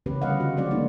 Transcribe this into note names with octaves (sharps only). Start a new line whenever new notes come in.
C#3 E3 B3 C#4 G4 B4
D3 G3 B4 D#5 F5 F#5
F4 F#4
F3 F#3 G#3 C4 D5 F#5
F#3 A#3 C4 D4 D#4